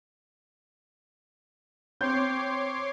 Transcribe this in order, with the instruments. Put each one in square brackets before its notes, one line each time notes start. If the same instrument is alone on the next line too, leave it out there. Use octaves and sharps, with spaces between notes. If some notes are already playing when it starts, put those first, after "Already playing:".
[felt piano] C4 G6 [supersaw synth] C#5 C6 D6